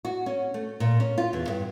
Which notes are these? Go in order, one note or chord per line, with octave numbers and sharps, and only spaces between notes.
F#4
C#4
A3
A#2
C#4
F4
E2
G2